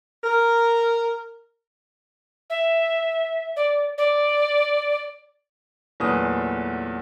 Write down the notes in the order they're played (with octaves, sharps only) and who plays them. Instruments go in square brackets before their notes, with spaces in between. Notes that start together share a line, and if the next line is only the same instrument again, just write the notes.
[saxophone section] A#4
[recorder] E5
D5
D5
[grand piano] E2 A#2 F#3 A3 B4 D#6